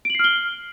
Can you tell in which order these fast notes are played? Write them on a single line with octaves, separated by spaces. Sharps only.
D7 F#7 C7 F6 G7